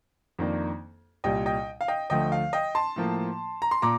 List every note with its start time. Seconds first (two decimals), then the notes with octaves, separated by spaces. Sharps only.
0.39 F2 D#3 A#3 D4
1.24 C2 A#2 G3 D#5 G5
1.46 D#5 G5
1.81 F5
1.88 D#5 G5
2.10 D2 D3 F3 A3 D#5 G5
2.32 F5
2.53 D#5 G5
2.75 A5 C6
2.96 A2 F3 A#3
3.62 A#5
3.71 C6
3.82 A#2 A#5 D6